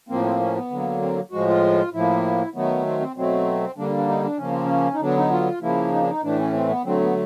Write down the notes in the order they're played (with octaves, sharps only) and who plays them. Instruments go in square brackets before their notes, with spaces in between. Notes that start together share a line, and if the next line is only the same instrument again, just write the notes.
[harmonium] A2 F3 A#3 C4
C4
C#4
B3
D3 F#3 A#3
C4
A2 F3 G#3 F#4
F4
A2 F3 A#3 E4
D#3 F#3 A3 B3
C4
C4
B2 F#3 A3 C4
D3 G3 A#3 D4
D4
D#4
D4
C#3 F3 A#3 C#4
C4
C#4
D#4
D3 F#3 B3 D4
D#4
F4
C#3 F3 A#3 E4
D#4
D4
D#4
A2 E3 A3 D4
C#4
C4
B3
D3 F#3 A3 C4
B3